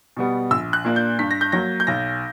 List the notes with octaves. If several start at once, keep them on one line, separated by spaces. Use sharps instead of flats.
B2 G3 B3
A#1 E6
F#6
A#2 A#3 D4
G6
G2 B6
A#6
G6
F#3 A#3 A#6
G6
B1 A#6